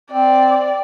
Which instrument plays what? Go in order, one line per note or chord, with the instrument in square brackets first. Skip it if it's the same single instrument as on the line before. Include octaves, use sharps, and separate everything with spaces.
[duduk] C4 [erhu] D5